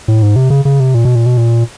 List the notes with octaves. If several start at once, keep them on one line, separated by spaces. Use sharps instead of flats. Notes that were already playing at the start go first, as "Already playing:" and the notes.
A2
G#2
C3
C#3
C#3
C3
A#2
B2
A#2
B2
A#2